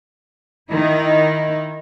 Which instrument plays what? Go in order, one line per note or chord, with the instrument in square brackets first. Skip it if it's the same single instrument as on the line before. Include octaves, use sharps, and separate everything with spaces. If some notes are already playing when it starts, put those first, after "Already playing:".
[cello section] D#3 D#4 E4